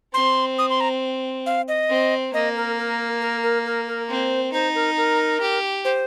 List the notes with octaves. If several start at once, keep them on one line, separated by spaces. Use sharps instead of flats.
C4 C6
D#6
C6
A#5
F5
D#5
C4
A#3 D#5
A#4
A#4
A#4
A#4
A#4
A#4
C4 C5
D#4 C5
A#4
A#4
G4
C5